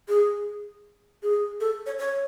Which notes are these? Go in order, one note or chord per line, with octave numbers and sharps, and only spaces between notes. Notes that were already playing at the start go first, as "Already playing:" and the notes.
G#4
G#4
A4
C#5
C#5